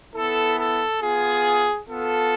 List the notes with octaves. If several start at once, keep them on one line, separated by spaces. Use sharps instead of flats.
B3 E4 A4
A4
B3 F4 G#4
B3 F4 A4